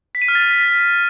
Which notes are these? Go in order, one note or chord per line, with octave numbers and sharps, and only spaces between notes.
B6
D#7
F6
A6
B6